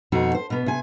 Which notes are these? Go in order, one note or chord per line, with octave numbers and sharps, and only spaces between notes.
F2 B2 D#4 F#4
C5
B2 B3
C3 G#5